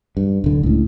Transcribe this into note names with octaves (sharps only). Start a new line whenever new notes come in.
G2
D1 D3
C#2 A2